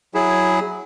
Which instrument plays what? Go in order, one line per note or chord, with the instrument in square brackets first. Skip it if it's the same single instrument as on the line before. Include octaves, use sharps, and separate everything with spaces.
[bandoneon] F#3 E4 G#4